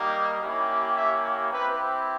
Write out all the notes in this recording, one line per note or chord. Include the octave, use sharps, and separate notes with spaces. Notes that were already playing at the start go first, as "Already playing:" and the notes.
Already playing: G3 A#3 D#4 G4
A#3 C#4 E4 G4
E5
C4 E4 G4 B4